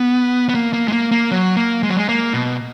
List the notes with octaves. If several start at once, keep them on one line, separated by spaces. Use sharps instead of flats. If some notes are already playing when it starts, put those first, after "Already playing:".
Already playing: B3
B3
A#3
A#3
G#3
A#3
A#3
F#3
A#3
G#3
F#3
G#3
A#3
B2